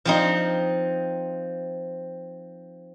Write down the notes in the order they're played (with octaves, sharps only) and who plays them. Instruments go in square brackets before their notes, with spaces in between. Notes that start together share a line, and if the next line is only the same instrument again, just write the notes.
[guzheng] F3 C4 D#4